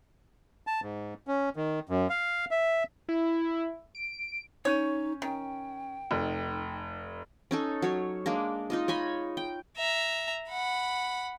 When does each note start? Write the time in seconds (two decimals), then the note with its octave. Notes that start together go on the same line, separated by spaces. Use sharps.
0.67 A5
0.83 G#2
1.27 C#4
1.56 D#3
1.89 F#2
2.10 F5
2.51 E5
3.09 E4
3.95 D7
4.65 C#4 D#4 C#5 G6 D#7
5.22 D#3 C#4 G5
6.11 F1 D#4
7.51 C#4 D#4 A4
7.82 F#3 C#5
8.26 G#3 A#3 D4
8.70 D#4 F4 D#5
8.88 C#5 D#5 G#5 B5
9.37 G5
9.77 E5 A#5
10.49 F#5 B5